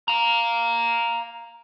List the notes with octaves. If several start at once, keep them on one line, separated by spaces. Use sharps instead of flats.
F5 A#5